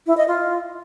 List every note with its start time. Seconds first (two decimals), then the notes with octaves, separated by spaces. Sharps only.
0.07 E4
0.17 D#5
0.28 F4